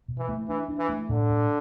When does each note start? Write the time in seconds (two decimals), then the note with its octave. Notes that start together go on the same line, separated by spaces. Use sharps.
0.08 B2
0.18 E3
0.29 A3
0.49 E3 D4
0.68 D4
0.78 E3
0.89 A3
1.09 A2 D3
1.30 A2